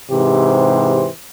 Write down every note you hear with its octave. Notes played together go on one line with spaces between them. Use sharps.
G#2 C3 E3 G4 C5